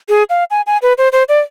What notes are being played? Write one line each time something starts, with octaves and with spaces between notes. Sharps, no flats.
G#4
F5
G#5
G#5
B4
C5
C5
D5